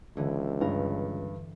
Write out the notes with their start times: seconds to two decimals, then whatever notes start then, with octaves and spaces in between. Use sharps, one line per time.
0.17 C#2 D3 E3
0.61 G2 A#4